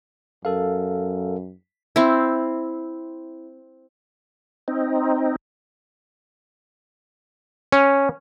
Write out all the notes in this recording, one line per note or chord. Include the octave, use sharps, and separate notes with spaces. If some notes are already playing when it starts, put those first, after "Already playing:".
F#2 A4 A#4 F5
C4 E4
C4 D#4
C#4